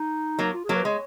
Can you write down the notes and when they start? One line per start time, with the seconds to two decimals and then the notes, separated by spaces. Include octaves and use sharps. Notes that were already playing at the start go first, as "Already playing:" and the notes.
Already playing: D#4
0.39 F#3 A#3
0.54 F4
0.64 G#4
0.69 F#3 A#3
0.75 B4
0.85 G#3 C#5